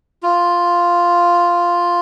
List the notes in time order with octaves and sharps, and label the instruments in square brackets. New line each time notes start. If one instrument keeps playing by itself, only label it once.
[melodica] F4